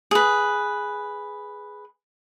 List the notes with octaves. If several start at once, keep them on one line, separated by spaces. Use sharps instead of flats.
G#4 B4